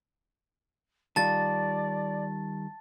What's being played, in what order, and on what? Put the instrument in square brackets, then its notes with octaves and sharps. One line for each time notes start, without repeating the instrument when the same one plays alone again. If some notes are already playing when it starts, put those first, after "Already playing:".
[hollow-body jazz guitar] D#3 G3 F4 [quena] D5 [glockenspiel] A5 A6